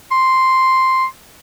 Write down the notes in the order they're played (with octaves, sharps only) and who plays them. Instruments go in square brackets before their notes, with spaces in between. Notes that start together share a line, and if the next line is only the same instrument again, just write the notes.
[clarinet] C6